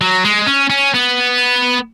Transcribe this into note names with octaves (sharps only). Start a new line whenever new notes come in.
F#3
G#3
C#4
C#4
B3